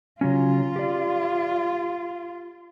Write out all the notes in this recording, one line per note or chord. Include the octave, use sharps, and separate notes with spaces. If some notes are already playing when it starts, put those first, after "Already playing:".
C#3 F#3 C#4 F4
G4 D5